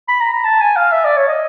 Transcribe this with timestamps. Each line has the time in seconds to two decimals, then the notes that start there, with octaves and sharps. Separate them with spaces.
0.08 B5
0.21 A#5
0.33 A#5
0.44 A5
0.61 G#5
0.76 F5
0.92 E5
1.05 D5
1.17 C#5
1.28 D#5